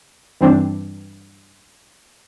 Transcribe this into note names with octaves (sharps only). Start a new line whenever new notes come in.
G2 E3 C4 D4